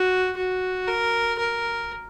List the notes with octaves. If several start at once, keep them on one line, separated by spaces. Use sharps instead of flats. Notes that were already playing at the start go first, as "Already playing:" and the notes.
Already playing: F#4
F#4
A#4
A#4